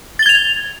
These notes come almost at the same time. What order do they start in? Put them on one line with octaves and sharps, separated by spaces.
A6 G7 G#6 F7